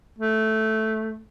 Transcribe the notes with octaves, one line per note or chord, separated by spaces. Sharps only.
A3